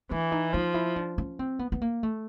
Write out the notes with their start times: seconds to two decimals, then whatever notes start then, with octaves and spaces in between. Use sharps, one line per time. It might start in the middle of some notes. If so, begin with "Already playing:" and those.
0.11 E3 D4
0.32 D#4
0.53 F3 D#4
0.74 E4
0.96 D4
1.18 C#4
1.39 C4
1.59 B3
1.72 B3
1.81 A#3
2.03 A3